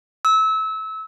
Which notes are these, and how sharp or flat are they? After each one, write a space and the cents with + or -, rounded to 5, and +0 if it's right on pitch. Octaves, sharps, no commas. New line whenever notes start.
E6 -25